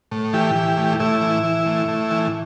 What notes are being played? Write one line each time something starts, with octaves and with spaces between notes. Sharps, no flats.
A2
E3 G4
E3
A2
A2 E4
E3
E3
A2
A2
E3